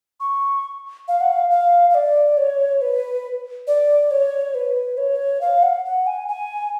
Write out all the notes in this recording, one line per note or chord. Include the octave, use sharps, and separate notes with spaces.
C#6
F5
F#5
F5
F5
F5
D5
C#5
B4
D5
C#5
B4
C#5
F5
F#5
F#5
G#5
G#5